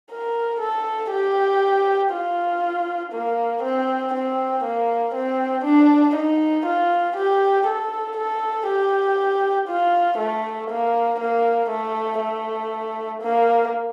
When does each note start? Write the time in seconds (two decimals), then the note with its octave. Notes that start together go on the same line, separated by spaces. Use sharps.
0.11 A#4
0.60 A4
1.11 G4
2.12 F4
3.12 A#3
3.63 C4
4.14 C4
4.64 A#3
5.15 C4
5.65 D4
6.16 D#4
6.66 F4
7.16 G4
7.67 A4
8.17 A4
8.68 G4
9.68 F4
10.18 A3
10.70 A#3
11.20 A#3
11.70 A3
12.20 A3
13.22 A#3